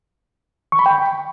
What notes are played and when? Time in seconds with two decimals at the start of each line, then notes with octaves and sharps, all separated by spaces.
0.72 C#6
0.79 B5
0.86 G5